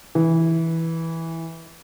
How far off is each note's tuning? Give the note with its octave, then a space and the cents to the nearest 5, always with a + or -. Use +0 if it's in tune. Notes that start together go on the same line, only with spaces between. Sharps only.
E3 -10